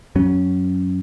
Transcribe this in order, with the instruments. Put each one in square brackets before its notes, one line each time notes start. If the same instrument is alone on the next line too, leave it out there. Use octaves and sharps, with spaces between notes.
[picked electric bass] F#2 F#3 C#4